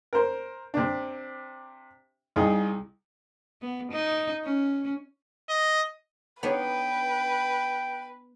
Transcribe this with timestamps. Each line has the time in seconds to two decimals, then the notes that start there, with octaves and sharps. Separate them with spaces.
0.13 A#4 C5
0.74 C3 D4
2.36 C2 D#4 G#4
3.62 B3
3.91 D#4
4.44 C#4
5.49 D#5
6.43 B3 D4 D#4 B4 C#5 G5